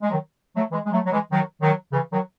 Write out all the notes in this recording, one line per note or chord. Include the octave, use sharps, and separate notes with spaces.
G#3
D#3 F#3
F#3 A3
E3 G#3
G#3
F#3 A3
F#3
E3 G#3
D#3 F#3
D#3 F#3
C#3 E3
D#3 F#3